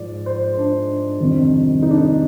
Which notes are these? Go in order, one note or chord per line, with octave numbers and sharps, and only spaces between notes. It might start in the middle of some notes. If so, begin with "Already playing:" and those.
Already playing: G#2 F3 D5
C5
D4
F2 C3 D#3 G3
D#4
D4
D#4